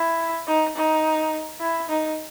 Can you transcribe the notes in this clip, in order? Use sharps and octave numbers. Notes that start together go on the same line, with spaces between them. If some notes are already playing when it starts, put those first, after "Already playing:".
Already playing: E4
D#4
D#4
E4
D#4